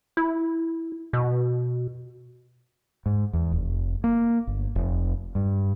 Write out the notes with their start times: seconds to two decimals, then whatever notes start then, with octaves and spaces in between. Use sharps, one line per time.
0.17 E4
1.13 B2
3.06 G#2
3.33 E2
3.52 F1
4.04 A#3
4.47 G1
4.76 F1
5.35 G2